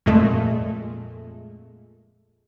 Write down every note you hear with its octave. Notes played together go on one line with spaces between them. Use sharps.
F2 A#2 G#3 A3